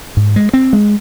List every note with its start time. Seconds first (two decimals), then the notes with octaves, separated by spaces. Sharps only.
0.17 G#2
0.36 G#3
0.53 C4
0.73 G#3